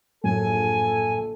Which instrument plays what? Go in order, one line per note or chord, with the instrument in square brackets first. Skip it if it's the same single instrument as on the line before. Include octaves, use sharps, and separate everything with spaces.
[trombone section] A#1 A4 [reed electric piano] F#2 A2 [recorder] G#5